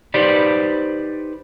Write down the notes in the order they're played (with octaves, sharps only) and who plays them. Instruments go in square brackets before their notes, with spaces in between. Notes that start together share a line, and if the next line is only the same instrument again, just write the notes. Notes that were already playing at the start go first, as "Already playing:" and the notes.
[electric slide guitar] D#4 G4 B4 C5 D5